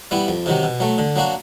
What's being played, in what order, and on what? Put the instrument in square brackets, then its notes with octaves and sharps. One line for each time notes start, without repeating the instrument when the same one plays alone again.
[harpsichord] G3 B3 E4
F2
C3 D#3 F#3
B2
F#3 A3
D3
F#3 A#3 D4 F#4